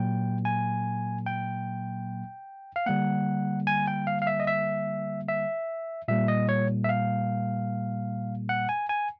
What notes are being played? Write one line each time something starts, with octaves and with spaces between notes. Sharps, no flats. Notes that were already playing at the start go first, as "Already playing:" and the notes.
Already playing: A#2 F#3 A#3 G5
G#5
G5
F5
D3 G3 A#3 F#5
G#5
G5
F5
F5
E5
D#5
E5
E5
A#2 G3 A#3 E5
D#5
C#5
E5
F5
F#5
G#5
G#5